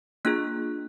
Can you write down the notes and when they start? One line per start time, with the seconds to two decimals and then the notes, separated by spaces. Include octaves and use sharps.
0.25 A#3 D4 F4 G#4 F#6